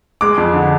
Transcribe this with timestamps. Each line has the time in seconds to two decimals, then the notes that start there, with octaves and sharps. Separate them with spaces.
0.21 G#3 D6
0.37 F2
0.54 D3